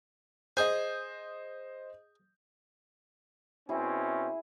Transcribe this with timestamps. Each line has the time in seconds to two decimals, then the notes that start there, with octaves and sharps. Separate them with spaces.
0.57 G#4 C5 D#5 G#5 G6
3.69 B2 C4 C#4 E4 G#4